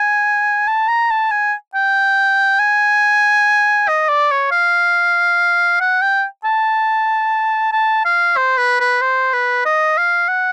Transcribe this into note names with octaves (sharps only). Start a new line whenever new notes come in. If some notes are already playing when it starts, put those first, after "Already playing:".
Already playing: G#5
A5
A#5
A5
G#5
G5
G#5
D#5
D5
C#5
F5
F#5
G5
A5
A5
F5
C5
B4
B4
C5
B4
D#5
F5
F#5